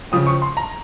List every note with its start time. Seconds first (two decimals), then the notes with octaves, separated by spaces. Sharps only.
0.12 C#3 F3 C4 D#6
0.27 C#6
0.42 C6
0.57 A#5